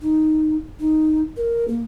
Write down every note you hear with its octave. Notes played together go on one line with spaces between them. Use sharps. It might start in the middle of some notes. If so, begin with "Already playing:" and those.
D#4
D#4
A#4
A#3